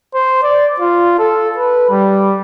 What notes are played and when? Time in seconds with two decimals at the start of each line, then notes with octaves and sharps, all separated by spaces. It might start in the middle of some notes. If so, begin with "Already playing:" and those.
0.14 C5
0.43 D5
0.80 F4
1.19 A4
1.58 B4
1.90 G3